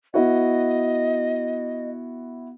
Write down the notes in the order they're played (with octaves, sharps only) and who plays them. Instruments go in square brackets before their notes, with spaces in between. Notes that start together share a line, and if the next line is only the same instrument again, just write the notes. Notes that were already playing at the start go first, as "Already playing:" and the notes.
[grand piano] B3 E4 F#4 [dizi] D#5